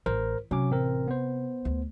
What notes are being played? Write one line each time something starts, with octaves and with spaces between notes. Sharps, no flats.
A1 A#4 C5
C3 F#3 C#4 D6
A1 C4 A#4
B3 C5
D2